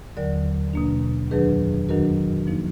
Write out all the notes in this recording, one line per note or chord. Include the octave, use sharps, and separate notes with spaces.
D#2 D3 F#3 A#4 D5
B2 A#3 D4
F2 D#3 F#3 D4 G#4 B4
F#2 D#3 F#3 D4 F#4 A#4
F3 A#3 D#4